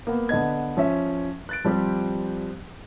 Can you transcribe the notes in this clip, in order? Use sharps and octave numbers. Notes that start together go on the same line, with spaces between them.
A#3 B3
D3 B3 D#5 G#6
F3 C#4 E5
F#6 A6 D7
F3 G3 C4 G4